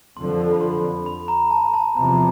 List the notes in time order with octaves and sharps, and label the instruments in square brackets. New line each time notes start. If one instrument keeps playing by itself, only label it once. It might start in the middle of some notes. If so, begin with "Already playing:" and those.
[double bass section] F2 D3 F3 [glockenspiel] C6
[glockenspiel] B5
C6
B5
A#5
A5
A5
[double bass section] E2 C3 F3 [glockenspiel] A#5